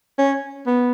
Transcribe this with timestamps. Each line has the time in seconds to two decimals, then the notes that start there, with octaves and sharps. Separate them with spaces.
0.18 C#4
0.67 B3